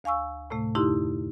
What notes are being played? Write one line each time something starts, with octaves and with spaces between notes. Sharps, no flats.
D2 F5 G#5 C#6 E6
A2 C3 A3
F2 D3 D#4 E4 G4 C6